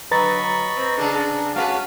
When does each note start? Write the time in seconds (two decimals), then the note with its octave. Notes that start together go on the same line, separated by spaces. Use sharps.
0.11 D3 F#3 B4 D#5 A#5 B5 C#6 A6
0.77 C4
0.98 C#3 D4 G#4 A4
1.56 G#3 C#4 F#4 B4 F5